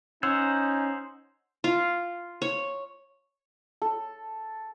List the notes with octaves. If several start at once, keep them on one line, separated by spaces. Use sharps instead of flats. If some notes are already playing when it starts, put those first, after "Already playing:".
C#4 D#4 C5 C#5 F#5 E6
F4
C#5
A4